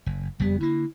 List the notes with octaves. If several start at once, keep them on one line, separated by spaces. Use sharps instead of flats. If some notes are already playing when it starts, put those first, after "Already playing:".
F#1
F#1 F2 G3 B3
D3 A#3 E4